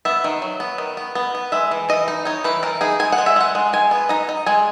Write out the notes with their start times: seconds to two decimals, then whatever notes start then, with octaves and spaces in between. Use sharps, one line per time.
0.05 B3 E5
0.24 D#3
0.42 F#3
0.60 B3
0.78 D#3
0.97 B3
1.15 B3
1.35 B3
1.52 G#3 E5
1.71 E3
1.89 E3 D#5
2.08 D#4
2.25 D#4 C#5
2.44 E3 B4
2.63 E3 A#4
2.81 D#4 G#4
3.00 G#3 G#5
3.12 F#5
3.18 G#3
3.26 E5
3.36 G#3 F#5
3.55 G#3
3.73 G#3 G#5
3.91 B3
4.09 D#4 A#5
4.29 D#4
4.46 G#3 G#5